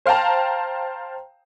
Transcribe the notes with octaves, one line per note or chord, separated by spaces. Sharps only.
C5 F5 G5 A5 A#5